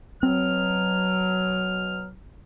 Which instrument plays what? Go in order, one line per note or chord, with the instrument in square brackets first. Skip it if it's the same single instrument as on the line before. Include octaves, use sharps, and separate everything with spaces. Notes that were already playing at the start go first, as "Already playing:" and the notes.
[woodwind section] B2 F#3 [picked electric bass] C4 [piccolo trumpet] F6